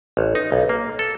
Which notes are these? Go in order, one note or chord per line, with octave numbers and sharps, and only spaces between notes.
A1
D#4
B1
A#3
A4